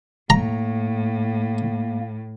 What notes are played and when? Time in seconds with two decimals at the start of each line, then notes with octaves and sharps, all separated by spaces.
0.30 A2 A#3 A#5